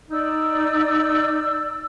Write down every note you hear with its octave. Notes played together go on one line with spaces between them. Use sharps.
D#4 D5 E6